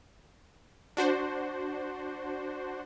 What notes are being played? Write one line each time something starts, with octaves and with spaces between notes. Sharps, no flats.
D4 F#4 C5